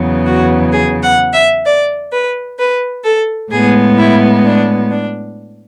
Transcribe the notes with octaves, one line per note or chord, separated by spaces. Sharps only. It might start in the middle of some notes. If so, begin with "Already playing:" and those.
Already playing: E2 C#3 F#3 B3
F#4
G#4
F#5
E5
D5
B4
B4
A4
A2 G#3 B3 G#4
E4
D4
D4